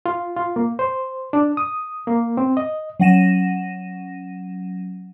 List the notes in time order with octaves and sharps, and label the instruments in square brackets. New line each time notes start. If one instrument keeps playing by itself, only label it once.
[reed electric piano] F4
F4
A#3
C5
D4
D#6
A#3
C4
D#5
[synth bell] F#3 C#4 F#5 A#6 D#7 E7